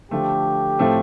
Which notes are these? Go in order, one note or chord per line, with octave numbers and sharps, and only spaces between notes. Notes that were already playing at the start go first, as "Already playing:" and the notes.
D3 F3 A3 G4
A2 F3 A3 C4